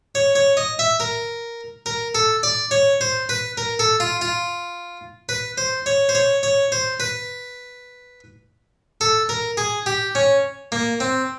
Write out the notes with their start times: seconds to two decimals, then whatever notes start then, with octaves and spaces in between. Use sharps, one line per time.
0.15 C#5
0.35 C#5
0.57 D#5
0.79 E5
1.00 A#4
1.86 A#4
2.15 A4
2.43 D5
2.71 C#5
3.01 C5
3.29 B4
3.58 A#4
3.79 A4
4.00 F4
4.21 F4
5.29 B4
5.58 C5
5.86 C#5
6.09 C5
6.15 C#5
6.43 C#5
6.72 C5
7.00 B4
9.01 A4
9.29 A#4
9.57 G#4
9.86 G4
10.15 C#4
10.72 A#3
11.00 C4